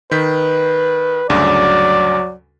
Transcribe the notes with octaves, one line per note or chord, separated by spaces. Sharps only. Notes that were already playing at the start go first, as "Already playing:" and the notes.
D#3 B4 G6 B6
D2 G2 C#3 F#3 D5